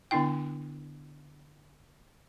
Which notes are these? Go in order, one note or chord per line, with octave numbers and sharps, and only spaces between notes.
D3 B3 D4 E4 G5